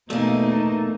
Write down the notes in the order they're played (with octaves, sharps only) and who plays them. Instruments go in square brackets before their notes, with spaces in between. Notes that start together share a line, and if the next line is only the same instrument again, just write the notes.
[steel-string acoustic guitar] E2 A#3 [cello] B2 D#4 [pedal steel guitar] A3